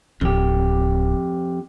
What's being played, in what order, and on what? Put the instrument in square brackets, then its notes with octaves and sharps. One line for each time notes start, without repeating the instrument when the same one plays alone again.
[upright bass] D1 [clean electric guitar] F2 G4